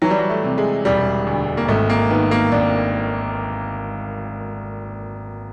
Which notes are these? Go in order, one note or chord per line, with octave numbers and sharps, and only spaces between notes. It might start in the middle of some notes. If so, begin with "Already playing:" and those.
E3 F#3
G3
F#3
A3
C3
G#3
E1 G3
D2
A#3
G#1 A3
A#3
D#3 B3
A#3
G#1 D4